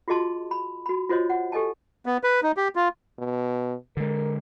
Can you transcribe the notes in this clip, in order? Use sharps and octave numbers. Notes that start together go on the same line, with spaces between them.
F4 F#4 G#4 D#5 A5 C6
B5
F#4 B5
F4 F#4 C5 C#5 D#5
F#5
G4 A4 D#5 G#5 A5
B3
B4
D#4
G4
F4
B2
D3 G#3 A#4